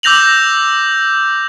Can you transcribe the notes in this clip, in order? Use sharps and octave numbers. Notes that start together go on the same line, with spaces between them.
D6 E6 G6 A#6 F7 F#7